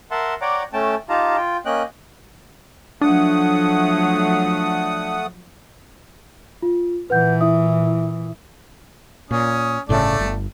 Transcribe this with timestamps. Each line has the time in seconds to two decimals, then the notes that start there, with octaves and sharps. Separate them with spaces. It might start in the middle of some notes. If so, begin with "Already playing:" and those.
0.11 A#4 E5 F#5 A5 C6
0.41 C#5 D5 F#5 G5 A#5 D6
0.73 A3 C#4 G5 A5
1.09 D#4 F4 G4 F5 A5 A#5
1.37 F4 G5
1.65 A#3 C#4 D#5 G5 F#6
3.01 F3 F#3 A3 D4 F#5 D#6
6.62 F4
7.10 A#2 E3 B4 F#5 G6
7.41 E4 E5 D#6
9.31 A#2 C#4 D#6
9.89 G1 A2 C#3 A3 D5 A5
10.19 G1